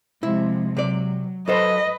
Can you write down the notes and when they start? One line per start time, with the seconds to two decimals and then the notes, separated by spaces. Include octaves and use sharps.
0.23 C3 F3 G#3 E4
0.77 C3 F#3 D5
1.48 F#3 A4 B4 C5 D#5